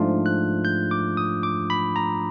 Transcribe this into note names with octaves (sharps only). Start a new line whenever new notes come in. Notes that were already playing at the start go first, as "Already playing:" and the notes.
Already playing: G#2 F3 A3 D4 F4
F#6
G6
D6
D#6
D6
B5
A#5